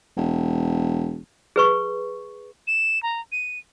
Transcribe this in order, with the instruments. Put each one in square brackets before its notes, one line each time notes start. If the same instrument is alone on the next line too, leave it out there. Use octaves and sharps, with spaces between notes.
[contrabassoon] E1
[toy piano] G#4 B4 C#6
[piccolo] E7
A#5
D#7